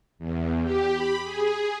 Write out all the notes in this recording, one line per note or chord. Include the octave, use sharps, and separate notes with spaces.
E2
G4
B5
G#4